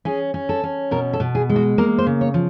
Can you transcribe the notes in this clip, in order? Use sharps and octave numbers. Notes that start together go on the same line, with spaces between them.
C#4 G#4
C#4
A4
C#4
B2 A#4
A4
B2
G#4
G#3
F#4
A#3 A#4
C5
C#3
C#5
F3